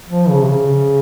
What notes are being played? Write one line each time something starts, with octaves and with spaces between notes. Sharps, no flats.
F3
C#3
C3
C#3